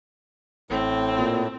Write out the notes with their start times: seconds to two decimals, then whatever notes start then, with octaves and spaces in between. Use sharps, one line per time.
0.70 A1 A2 C4
1.18 A#2